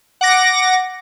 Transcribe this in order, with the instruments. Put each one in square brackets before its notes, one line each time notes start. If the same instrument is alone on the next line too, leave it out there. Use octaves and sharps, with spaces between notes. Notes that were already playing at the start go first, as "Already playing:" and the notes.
[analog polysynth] F#5 D6 A#6